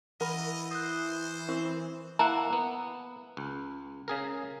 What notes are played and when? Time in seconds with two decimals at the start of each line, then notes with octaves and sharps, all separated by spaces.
0.21 E3 A#4 D#5 F#5 B5
0.71 C5 D#6 F#6
1.49 C4 E4
2.19 A#3 E4 F#5 A#5
2.53 B3
3.37 C#2
4.08 C#3 G#4 A#4